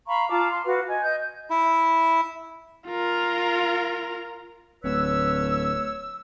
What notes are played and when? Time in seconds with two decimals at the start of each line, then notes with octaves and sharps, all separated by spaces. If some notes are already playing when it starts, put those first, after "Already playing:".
0.07 F5 A#5 B5 C#6
0.30 F4 A5 A#5 D6
0.51 F5 C6
0.66 F#4 B4 F5
0.88 D#5 G#5
1.03 D#5 G6
1.50 E4
2.88 F4 A#4
4.84 D1 B4 C#5 E6